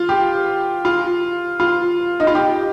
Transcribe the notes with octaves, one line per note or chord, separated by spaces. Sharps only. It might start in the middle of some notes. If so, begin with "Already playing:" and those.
Already playing: F4
G4
F4
F4
D#4
F4
G4